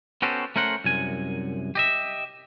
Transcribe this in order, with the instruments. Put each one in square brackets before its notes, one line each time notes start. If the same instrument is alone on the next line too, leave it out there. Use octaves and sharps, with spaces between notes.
[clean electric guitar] B3 C#4 F#4 G4 A4 C5
A3 C#4 A#4 C5 F#5
C2 F#2 G#5
G4 D#5 E5